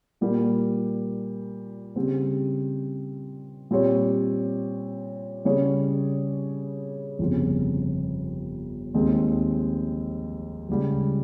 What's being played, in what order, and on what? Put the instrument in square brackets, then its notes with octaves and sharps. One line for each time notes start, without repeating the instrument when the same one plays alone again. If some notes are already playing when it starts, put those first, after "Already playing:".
[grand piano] A#2 G3 A#3
C#3 G3 C4 G4 C5
A#2 G3 C4 G4 C#5
C#3 G3 C#4 G#4 C#5
G1 F2 C#3 F3 C4
D#2 D#3 G#3 C4
C#2 C#3 G3